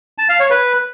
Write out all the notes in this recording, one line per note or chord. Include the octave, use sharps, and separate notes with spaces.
A5
F5
C#5
B4